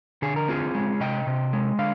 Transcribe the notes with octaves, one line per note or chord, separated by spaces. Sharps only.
D3 G#4
A#4
C4 F4 G#4
G#3
C3 D#5 G5
C3
G#3
D3 F5